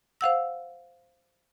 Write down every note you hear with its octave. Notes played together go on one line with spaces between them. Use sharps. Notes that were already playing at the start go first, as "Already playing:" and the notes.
C5 F5 F#5 E6